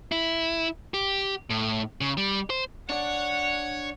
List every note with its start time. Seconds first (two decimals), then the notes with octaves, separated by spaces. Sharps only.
0.12 E4
0.94 G4
1.50 A2
2.01 C#3
2.17 G3
2.50 C5
2.90 D4 C#5 D5 F#5